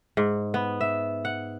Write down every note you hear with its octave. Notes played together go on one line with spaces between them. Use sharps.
G#2
B3
E5
F#5